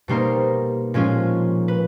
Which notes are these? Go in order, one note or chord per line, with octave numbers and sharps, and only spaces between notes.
B2 G3 A#3 D#4 A#4 C5
A#2 F3 G#3 C#4 F4
B4